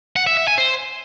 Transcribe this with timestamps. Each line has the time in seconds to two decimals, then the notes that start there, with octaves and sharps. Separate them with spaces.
0.16 F#5
0.27 E5
0.37 E5
0.47 G#5
0.58 C5